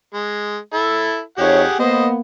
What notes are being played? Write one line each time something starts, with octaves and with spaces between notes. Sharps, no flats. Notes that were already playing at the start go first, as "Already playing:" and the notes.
G#3
E4 A4
F2 D#4 G4 G#4 C#5 F#5
A#3 B3 C5 D#5